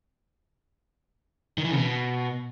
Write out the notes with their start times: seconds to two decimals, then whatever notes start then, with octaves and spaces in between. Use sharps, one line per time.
1.58 D#3
1.64 E3
1.71 C#3
1.77 B2